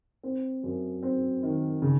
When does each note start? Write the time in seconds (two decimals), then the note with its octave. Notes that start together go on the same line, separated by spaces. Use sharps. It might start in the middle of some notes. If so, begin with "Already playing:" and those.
0.23 C4
0.64 F#2
1.03 C4
1.43 D#3
1.82 C#3